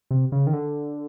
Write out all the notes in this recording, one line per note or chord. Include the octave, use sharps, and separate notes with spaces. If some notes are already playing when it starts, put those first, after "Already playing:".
C3
C#3
D#3
D3